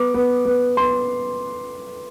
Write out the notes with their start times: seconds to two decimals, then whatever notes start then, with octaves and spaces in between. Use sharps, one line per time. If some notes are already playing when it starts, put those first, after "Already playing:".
Already playing: B3 D6
0.14 B3
0.45 B3
0.77 B3 C6